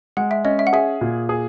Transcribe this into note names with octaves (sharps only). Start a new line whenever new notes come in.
G#3 F#5
E5
C#4 D#5
E5
F#5
G#4 E5
A#2
G#4